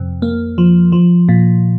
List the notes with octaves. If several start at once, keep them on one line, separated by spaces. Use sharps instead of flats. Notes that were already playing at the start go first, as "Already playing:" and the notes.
Already playing: F2 C3
A#3
F3
F3
A#2